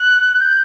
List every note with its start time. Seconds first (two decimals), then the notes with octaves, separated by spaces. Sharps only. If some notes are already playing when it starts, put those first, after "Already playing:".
Already playing: F#6
0.40 G6